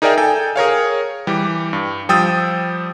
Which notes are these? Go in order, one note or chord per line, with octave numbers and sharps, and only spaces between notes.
D#4 G#4 A#4 D5 E5 G5
A4 G5 G#5
G#4 A#4 C#5 F5
E3 G3 G4
G2
F3 G3 G5 D#6 E6 A6